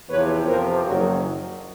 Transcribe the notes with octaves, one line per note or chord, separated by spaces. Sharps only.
E2 C3 F3 B4 C#5
F2 C3 F3 A#4 C5
F#1 F#2 D#3 F#3 F#4 G#4